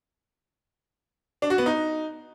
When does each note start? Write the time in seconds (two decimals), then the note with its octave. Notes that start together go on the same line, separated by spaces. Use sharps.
1.42 D4
1.50 F#4
1.58 B3
1.66 D#4